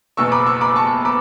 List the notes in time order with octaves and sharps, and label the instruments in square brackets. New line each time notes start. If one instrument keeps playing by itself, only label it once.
[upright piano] F#1 E2 B2 C#6 E6
B5 D6
C#6 E6
B5 D6
A5 C#6
B5 D6